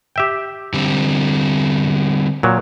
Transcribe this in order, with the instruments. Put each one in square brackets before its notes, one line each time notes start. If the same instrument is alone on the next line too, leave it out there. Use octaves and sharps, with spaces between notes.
[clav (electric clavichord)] G4 E5 G5
[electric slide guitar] D3 G3 C4
[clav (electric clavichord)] A#2 F#3